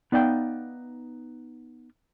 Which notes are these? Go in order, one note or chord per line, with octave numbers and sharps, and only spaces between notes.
B3 D#4 D5 F5 G5